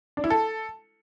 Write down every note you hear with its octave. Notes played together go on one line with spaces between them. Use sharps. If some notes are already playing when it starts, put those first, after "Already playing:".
D4
E4
A4